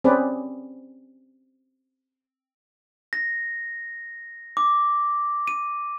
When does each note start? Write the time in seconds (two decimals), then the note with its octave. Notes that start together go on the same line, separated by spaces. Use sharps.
0.04 C4 C#4 G#4 B4 D5
3.13 A#6
4.57 D6
5.48 D#7